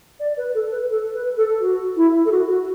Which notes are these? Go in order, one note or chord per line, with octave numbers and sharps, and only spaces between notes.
D5
B4
A4
B4
A4
B4
A4
F#4
E4
A4
F#4
F#4